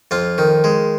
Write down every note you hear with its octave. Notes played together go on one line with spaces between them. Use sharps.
F2 F4
D#3
G#3